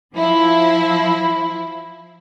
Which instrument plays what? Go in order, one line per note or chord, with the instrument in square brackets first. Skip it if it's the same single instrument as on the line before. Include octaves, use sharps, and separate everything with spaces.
[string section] F3 E4